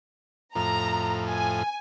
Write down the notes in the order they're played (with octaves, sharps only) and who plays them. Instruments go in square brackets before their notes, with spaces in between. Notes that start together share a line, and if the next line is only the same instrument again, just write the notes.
[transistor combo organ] F2 A2 [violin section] A#5
[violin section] G#5